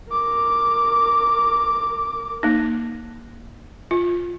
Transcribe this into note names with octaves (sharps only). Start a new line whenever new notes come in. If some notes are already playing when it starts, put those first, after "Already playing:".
A#4 D6
A#3 D#4
F4